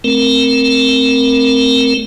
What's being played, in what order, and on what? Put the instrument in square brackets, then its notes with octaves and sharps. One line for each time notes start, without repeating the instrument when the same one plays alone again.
[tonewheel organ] A3 C4 A#4